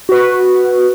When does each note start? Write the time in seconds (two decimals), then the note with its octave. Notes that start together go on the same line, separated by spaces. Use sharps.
0.09 F#4 B4